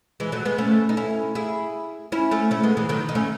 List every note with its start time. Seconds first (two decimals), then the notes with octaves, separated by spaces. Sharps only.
0.20 E3 G#3
0.32 F#3 A3
0.45 G#3 B3
0.58 A3 C#4
0.89 D#4
0.97 C#4 E4
1.35 E4 G#4
2.12 C#4 E4
2.31 A3 C#4
2.51 A3 C#4
2.63 G#3 B3
2.77 E3 G#3
2.89 D#3 F#3
3.09 D#4
3.15 A3 C#4